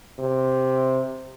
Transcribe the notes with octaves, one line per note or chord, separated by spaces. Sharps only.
C3